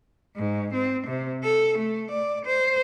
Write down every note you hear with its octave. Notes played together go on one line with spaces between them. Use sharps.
G#2
C4
C3
A4
A3
D5
C5